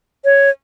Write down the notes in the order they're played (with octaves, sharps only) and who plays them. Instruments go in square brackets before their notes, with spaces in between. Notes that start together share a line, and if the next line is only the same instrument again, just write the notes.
[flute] C#5